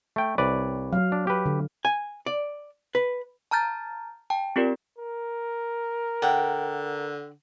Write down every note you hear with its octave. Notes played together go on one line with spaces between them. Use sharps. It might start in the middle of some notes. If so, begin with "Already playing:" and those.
A3 G5
C2 B4 C#5 D5
F#3 F5
D4
G4 B4
D3
G#5
D5
B4
A5 A#5 F6 G6 A6
G5 A5
C4 F4 G4 A#4 D5
A#4
D3 F#5 G5